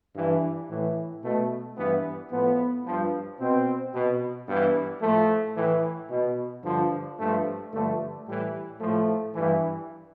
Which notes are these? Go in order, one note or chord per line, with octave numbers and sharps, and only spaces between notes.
G2 E3
A2 E3
B2 A3
G2 E3 B3
A2 F3 B3
G2 F3
B2 C4
B2
G2 E3 B3
A2 F3 A3
A2 E3
B2
G2 D3 F3
G2 F3 A3
G2 D3 F3 A3
A2 E3 G3
A2 F3 A3
G2 E3